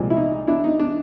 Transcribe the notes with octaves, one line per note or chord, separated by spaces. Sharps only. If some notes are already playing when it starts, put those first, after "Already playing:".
Already playing: C2 A#2 F3 G#3
E4
D#4
D4 E4
D#4
D4